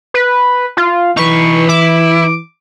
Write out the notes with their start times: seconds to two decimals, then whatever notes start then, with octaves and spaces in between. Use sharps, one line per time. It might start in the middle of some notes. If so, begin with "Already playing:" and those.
0.14 B4
0.77 F4
1.17 E3 D#4 B4 C#6
1.69 E4 D6